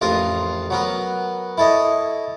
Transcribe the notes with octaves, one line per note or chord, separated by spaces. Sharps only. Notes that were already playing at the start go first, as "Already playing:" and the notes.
A1 F2 F4 A#4 D#6
F#3 B3 A#4
E4 A4 C#5 D#5